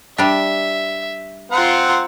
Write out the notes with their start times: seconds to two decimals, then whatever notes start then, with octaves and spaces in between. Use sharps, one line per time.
0.18 G3 D4 E5
1.52 C4 F4 F#5 A#5